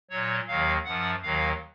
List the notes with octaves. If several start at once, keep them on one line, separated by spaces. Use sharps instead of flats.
A#2 F#3 C#5
D#2 D#3 F#3 F5
F#2 F3 F#5
D#2 D#3 F#3 F5